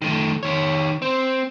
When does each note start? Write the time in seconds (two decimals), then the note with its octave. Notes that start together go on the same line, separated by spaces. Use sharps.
0.02 D#3 A3
0.43 D#3 C#5
1.02 C4